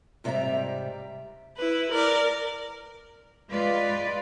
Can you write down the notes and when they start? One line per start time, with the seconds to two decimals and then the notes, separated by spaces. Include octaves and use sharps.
0.24 G#2 C3 G3 D5 E5 A#5
1.57 E4 B4
1.92 A#4 D5
3.50 G#3 F4 B4 D5